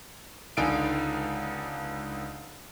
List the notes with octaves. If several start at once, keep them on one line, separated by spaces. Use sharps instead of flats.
C#2 D3 D#4 F5 G#5 D7